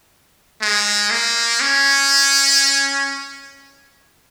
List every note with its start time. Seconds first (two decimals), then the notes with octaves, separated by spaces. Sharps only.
0.62 G#3
1.11 A#3
1.61 C#4